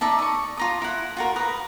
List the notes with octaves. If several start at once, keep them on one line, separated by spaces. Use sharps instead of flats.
D#4 D5 E5 A5
C#6 D#6
F4 A#5 D#6
E4 F#5
F4 F#4 A#4
A#4 B4 D#6